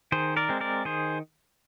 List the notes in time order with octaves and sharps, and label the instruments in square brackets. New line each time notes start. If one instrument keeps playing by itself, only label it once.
[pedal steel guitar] D#3 G#4 C5
A#4 D5
G#3 C4
A#4 D5
D#3 G#4 C5